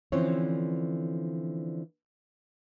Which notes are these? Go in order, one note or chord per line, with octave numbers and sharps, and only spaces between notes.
D3 E3 F3 C4 C#4 C#5